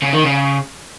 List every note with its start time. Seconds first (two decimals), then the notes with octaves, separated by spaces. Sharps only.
0.02 C#3
0.13 D#3
0.24 C#3